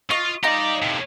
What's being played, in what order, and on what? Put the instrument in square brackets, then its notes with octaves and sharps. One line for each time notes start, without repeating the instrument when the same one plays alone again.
[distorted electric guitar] F4 [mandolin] D#5 C#6
[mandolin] D#4 F4 A#5 [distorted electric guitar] G4 D5
[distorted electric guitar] A2 C3